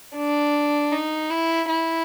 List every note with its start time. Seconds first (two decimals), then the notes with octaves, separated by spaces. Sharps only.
0.16 D4
0.92 D#4
1.30 E4
1.69 E4